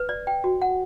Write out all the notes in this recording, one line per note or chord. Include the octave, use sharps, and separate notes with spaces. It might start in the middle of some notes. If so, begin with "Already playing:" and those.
Already playing: B4
D5
G5
F#4
F#5